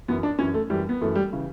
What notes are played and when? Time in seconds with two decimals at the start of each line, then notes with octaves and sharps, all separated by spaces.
0.08 F#2 E3 B3
0.23 D4
0.39 F#2 E3 C#4
0.54 A3
0.70 F#2 E3 G3
0.89 B3
1.01 F#2 E3 A3
1.15 G3
1.33 C#3 E3